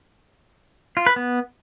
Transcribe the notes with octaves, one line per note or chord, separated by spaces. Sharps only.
F4
B4
B3